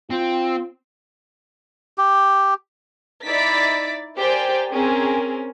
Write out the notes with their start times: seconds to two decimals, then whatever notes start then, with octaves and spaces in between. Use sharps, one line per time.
0.10 C4 F4
1.98 G4
3.26 D#4 E4 D5 A6 B6 D7
4.18 G4 A#4 C5 D5 G5 G#5
4.72 C4 C#4 G#4 A#4